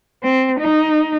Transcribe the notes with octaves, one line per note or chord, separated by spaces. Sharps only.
C4
D#4